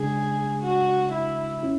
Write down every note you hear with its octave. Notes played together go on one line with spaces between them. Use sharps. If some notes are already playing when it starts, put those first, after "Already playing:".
Already playing: C#3 G#3 D4 G#4
F#4
E4
C#4 E4